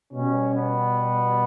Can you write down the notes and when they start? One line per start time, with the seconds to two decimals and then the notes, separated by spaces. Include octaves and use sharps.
0.13 B2 G3 C#4
0.55 B3